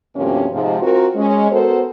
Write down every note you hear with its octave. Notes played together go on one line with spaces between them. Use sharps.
D2 G2 C3 F3 A#3 C#4
G#2 C3 F3
C4 F4 F#4 A#4
G#3 C#4
B3 F#4 A4 A#4 C5